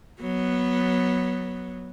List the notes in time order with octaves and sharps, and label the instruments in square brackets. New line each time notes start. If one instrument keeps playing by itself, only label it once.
[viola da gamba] F#3 B3